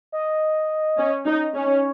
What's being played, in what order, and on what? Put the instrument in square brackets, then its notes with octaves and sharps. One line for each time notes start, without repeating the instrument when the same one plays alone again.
[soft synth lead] D#5
[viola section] C#4
D#4
[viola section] C#4 [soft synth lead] C#5